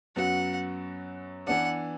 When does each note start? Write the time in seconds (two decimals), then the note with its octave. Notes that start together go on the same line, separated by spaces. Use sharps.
0.16 F#2 F#3 B3 F#4 F#5
1.47 E3 B3 D4 F#5